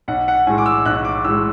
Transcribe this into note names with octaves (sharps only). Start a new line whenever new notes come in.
B1 F#5
F#5
A2 G#3 G#5
D6
E6
B1 F#6
D6
A2 G#3 E6